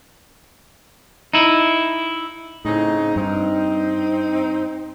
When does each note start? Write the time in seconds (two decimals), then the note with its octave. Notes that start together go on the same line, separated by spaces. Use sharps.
1.33 D#4 E4
2.65 A2 C#3 C4 D#4
3.16 G2 C4 D#4